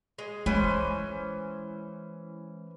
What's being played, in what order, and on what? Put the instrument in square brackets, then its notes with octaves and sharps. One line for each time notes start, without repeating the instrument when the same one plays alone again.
[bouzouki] G#3
[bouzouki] E3 C#4 C5 [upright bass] G#3